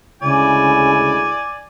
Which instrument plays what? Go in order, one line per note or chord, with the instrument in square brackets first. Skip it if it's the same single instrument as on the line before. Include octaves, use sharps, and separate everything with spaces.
[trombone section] D2 G#3 E4 [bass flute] C#3 [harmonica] D5 G#5